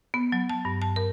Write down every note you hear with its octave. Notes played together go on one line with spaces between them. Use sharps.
B3
F#3
A5
G2
A5
A#4